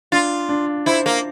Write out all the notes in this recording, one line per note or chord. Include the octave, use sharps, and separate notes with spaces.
D4 F4
D4
E4 C5
A#3